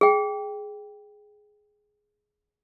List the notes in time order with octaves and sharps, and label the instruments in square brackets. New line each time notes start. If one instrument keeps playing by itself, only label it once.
[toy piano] G#4 G5